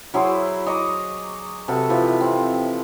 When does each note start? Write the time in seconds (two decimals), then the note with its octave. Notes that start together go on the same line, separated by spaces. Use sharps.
0.14 F#3 E4 G#4 C5
0.66 D#5 A#5 C#6 D6
1.68 C3 F#4 A4 B4
1.89 E3 F3 F4
2.20 C4